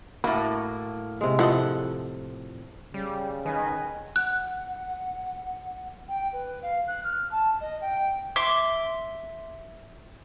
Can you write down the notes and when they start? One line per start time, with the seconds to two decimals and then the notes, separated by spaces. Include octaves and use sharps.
0.24 A2 A#3 E4 F#4
1.21 C3 G#3
1.39 F3 E4 A4 D5 D#5 F#5
2.94 C#3 G3
3.46 D#3 D#4 B4 D#5 G#5
4.16 F#5 F#6
6.08 G5
6.32 B4
6.63 F5
6.88 F#6
7.04 F6
7.31 A5
7.60 D#5
7.81 G5
8.36 E5 C6 D6